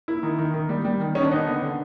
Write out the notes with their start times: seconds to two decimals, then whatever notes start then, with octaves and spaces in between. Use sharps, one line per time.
0.08 A#3 E4
0.23 D#3
0.39 D#3
0.54 D#3
0.69 G3
0.85 G3
1.00 D#3
1.15 D#3 C#4
1.23 D4
1.31 B3 D#4
1.47 D3
1.62 D3